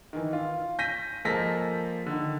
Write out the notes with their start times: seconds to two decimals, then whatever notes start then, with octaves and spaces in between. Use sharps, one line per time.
0.13 D#3 E3
0.33 F4
0.79 G6 A#6 B6 D#7
1.25 F3 G#3 A#3 A4 A#6 B6
2.06 D3 D#3